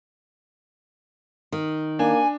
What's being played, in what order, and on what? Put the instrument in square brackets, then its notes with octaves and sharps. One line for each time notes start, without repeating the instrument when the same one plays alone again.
[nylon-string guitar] D#3
[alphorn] A#3 [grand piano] D4 [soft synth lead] G#5